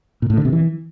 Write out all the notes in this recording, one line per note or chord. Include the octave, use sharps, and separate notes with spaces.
A#2
A2
D3
C3
E3